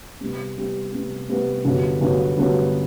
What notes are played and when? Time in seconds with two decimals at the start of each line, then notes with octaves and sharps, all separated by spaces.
0.21 C3 G3 B3
0.57 C3 G3 B3
0.92 C3 G3 B3
1.29 C3 G3 B3
1.65 G1 G2 F#3 B3
2.01 G1 G2 F#3 B3
2.38 G1 G2 F#3 B3